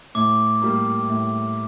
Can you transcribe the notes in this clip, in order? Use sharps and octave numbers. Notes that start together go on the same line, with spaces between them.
A2 D6
G3 A#3
A2